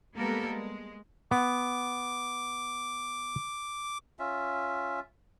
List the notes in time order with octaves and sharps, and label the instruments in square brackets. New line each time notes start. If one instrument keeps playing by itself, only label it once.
[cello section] G3 G#3 A#3 B3 A4 A#4
G#3
[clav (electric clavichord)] B3 [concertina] D6
[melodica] C#4 F4 E5